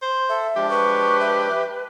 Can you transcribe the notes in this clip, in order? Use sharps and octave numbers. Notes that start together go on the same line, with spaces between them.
C5
A4 E5
F3 G#3 D4 G4
B4 C#6
E5